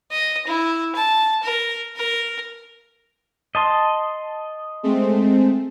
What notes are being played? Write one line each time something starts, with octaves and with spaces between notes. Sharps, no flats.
D#5
E4
A5
A#4
A#4
D#5 A5 C6
G#3 A3 C4